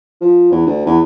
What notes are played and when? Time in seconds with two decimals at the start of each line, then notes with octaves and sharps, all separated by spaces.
0.21 F3
0.51 E2
0.66 D2
0.86 E2